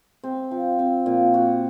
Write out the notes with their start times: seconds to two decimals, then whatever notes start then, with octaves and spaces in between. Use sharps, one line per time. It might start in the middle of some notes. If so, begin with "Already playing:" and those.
0.24 C4
0.51 F3
0.79 C4
1.06 A#2
1.34 F#4